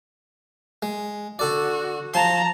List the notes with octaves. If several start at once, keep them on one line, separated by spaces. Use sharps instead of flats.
G#3
D3 F#4 A4 D5
F3 A5 A#5 C6